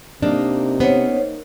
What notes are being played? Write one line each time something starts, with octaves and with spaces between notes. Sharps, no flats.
C3 A#3 D4 D#4
B3 C#4 C5 C#5